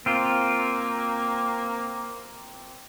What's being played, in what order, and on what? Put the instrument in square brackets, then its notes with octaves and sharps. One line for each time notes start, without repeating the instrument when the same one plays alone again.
[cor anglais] A#3 [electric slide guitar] C4 F4